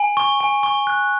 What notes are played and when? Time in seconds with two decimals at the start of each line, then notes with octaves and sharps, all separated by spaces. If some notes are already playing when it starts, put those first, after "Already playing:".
Already playing: G#5
0.17 C#6
0.40 G#5
0.63 C#6
0.87 F#6